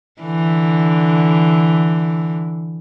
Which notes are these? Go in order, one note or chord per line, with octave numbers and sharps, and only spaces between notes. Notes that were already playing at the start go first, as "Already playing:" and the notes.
D3 E3